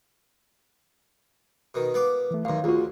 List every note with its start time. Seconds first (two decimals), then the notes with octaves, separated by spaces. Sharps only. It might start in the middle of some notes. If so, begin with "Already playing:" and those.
1.74 B2 D#3
1.94 B3 F5 D6
2.31 E3 A3
2.45 A1 F#2 D#3 F5
2.64 D2 F4 F#4 G#4